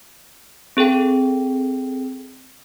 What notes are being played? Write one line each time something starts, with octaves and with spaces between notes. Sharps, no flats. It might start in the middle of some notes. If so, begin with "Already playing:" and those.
C4 G#4 A4 G5